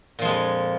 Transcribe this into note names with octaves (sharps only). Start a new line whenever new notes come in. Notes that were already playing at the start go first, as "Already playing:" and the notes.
F2 A#2 F3 G#3